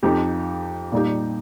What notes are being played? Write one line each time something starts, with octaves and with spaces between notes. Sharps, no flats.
F2 F3 D#4 G4
A#2 G3 D#4 G4